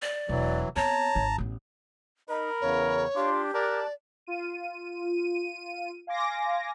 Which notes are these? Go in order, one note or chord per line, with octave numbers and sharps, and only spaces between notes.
D5
E1 E3 F#3
B3 C4 C#5 A5 A#5
G#1 D#4
A1 B3
D#4 A#4 B5
E2 C#3 C#5
D4 F4 G4 C6 D6
A#4 D5 A5 D6 F#6
F4 D#7
F5 G#5 C6 D6 A#6